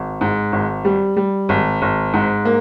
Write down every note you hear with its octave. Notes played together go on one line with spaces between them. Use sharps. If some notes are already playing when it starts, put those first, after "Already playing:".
Already playing: G#1
G#2
G#1
G3
G3
G#1
G#1
G#2
A#3